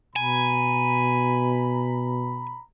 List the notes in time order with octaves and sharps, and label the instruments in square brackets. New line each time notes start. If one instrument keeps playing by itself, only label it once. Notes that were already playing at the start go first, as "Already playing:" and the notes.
[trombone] B2 [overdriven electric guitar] G#5 [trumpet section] A#5 B5